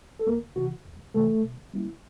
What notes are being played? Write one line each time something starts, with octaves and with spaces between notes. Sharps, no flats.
A4
E2 A#3 A#4
C3 E3 F#4
E2
C3 E3 A3 A4
B2
G3 A#3 C#4 E4